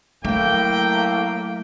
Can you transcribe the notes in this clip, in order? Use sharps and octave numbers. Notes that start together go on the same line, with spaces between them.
A2 F#3 A3 A#3 G5